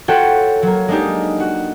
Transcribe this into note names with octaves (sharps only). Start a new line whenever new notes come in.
F4 F#4 A4 C#5 F#5 G5
F#3 A#3
G#3 A#3 D4 D#4 G4
F#4